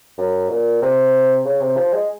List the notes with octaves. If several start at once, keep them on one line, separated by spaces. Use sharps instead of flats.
F#2
A#2
C3
C#3
C3
F3
G#3